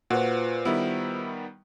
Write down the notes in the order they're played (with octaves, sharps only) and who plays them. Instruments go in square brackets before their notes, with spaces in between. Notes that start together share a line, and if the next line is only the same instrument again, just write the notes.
[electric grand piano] A#2 [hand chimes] F4 B4 C5 [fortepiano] F#4
[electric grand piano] D#3 G3 B3 [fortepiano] E4